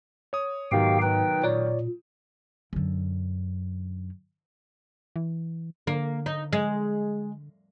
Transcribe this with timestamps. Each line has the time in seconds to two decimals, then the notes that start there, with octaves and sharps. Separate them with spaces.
0.33 C#5 D#6
0.72 G#2 B2 D#3 F#3 G4 F5 G5
1.02 D#4 B4 G5
1.44 A#2 C#5 D5
2.73 F#2 D3
5.16 E3
5.87 D3 A#3
6.26 D#4
6.53 G#3